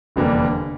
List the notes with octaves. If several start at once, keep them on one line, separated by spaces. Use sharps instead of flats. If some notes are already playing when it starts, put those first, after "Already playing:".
F1 E2 D3 G3 A#3